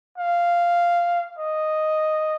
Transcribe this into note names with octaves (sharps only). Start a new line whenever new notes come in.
F5
D#5